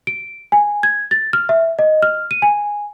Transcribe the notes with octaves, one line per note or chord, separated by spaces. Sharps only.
D7
G#5
G#6
A6
F6
E5
D#5
F6
D#7
G#5